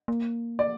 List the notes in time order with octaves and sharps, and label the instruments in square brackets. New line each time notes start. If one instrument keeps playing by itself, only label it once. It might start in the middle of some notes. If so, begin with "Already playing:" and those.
[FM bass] A#3
[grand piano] D5